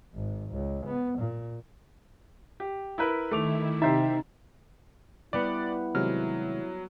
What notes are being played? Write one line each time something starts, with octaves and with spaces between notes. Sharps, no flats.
G#1
C#2
B3
A#2
G4
E4 A#4 B4
D#3 A3 E4 D6 F7
C3 D#4 G4 C5 E5
G3 B3 E4 D5 F#5
C3 D#3 F#3 G#3 F6